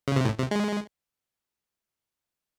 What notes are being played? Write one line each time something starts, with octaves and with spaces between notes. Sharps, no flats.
C#3
C3
A2
C3
G#3